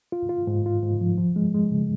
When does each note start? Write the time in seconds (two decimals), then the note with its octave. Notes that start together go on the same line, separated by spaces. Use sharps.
0.12 F4
0.29 F4
0.47 G#2
0.66 F4
0.83 G#2
1.01 F3
1.18 F3
1.36 G#3
1.54 G#3
1.71 C#3